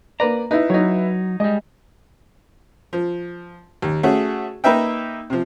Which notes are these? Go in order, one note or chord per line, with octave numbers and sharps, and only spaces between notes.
A#3 B4 D5 A#5
D#4 E4 B4
F#3 D#4 C#5
G3 G#3 D#5
F3
D#2
A3 C#4 F#4 G#4
A#3 D#4 B4 E5 G5
C3 F3